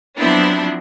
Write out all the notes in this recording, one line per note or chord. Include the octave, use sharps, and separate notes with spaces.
F3 F#3 B3 C4 D4 E4